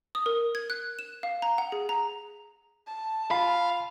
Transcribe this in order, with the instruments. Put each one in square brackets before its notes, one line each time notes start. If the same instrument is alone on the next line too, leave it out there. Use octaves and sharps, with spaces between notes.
[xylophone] D#6
A#4
G#6
F#6
E7
F5
A#5
F#5
G#4
A#5
[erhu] A5
[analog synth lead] F4 [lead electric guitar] F5 [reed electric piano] B5